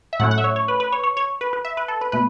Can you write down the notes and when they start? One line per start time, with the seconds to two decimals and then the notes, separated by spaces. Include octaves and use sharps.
0.13 E5
0.20 A2 F#3 A3 C#4 E4 F#5
0.31 F#5
0.38 E5
0.44 C#5
0.56 C#5
0.68 B4
0.80 B4
0.92 C#5
1.04 C#5
1.17 C#5
1.41 B4
1.53 B4
1.65 E5
1.77 B4
1.88 A4
2.01 B4
2.12 B2 A3 B4